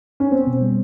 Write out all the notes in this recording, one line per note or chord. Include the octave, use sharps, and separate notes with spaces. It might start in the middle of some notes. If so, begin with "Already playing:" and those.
C#4
B3 C4
B2
G3